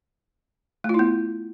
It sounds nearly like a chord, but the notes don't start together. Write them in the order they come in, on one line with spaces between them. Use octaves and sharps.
A3 F4 E4 B3